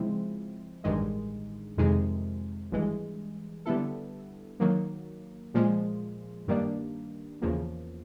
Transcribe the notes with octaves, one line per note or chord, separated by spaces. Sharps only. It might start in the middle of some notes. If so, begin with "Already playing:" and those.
Already playing: C#3 F3 G#3 C4 E4
A1 G2 D#3 G#3
F2 C3 D#3 G#3
G#1 G2 E3 G#3
D3 G3 B3 E4 A4
D#3 F#3 A#3
A#2 F3 G#3
G2 D#3 G3 A#3 D4
E2 C#3 F3 A#3